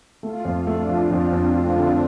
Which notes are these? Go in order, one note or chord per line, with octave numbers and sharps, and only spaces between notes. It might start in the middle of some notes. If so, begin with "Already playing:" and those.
A3 F4
F2
A3 D4
F3
F2 C4
F2
A3 F4
D3